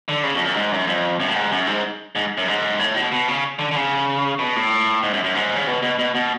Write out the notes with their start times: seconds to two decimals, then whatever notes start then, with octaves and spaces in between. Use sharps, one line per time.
0.09 D3
0.23 C#3
0.35 F2
0.45 F#2
0.56 G#2
0.72 F#2
0.87 F2
1.20 F#2
1.28 A2
1.35 G#2
1.52 F#2
1.67 G#2
2.15 G#2
2.38 F#2
2.48 G#2
2.79 A2
2.96 B2
3.12 B2
3.28 C#3
3.59 D3
3.71 D3
3.76 C#3
4.39 B2
4.56 A2
5.03 G#2
5.13 F#2
5.24 F#2
5.35 G#2
5.56 C#3
5.67 B2
5.83 B2
5.99 B2
6.15 B2